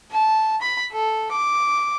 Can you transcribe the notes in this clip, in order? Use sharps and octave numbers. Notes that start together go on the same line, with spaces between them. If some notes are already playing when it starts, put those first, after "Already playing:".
A5
B5
A4
D6